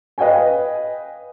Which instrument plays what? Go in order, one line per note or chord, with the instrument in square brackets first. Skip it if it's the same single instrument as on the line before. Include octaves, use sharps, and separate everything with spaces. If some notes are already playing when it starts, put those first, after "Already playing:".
[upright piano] B4 D#5 F5 G5 G#5